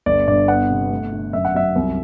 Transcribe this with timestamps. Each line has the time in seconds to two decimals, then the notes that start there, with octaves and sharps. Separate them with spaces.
0.06 G1 D5
0.27 G2 D5
0.48 B3 F#5
0.70 C3
0.91 A3
1.12 D3
1.33 F#2 E5
1.45 F#5
1.54 F#3 E5
1.76 C2